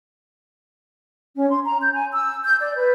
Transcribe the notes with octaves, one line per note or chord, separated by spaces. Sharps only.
C#4
C6
A#5
G6
G#5
E6
G6
D5
B4